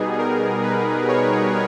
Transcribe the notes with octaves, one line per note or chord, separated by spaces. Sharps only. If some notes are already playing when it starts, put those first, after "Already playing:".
Already playing: B2 G3 B3 D#4 G#4
A#4
B4
C#5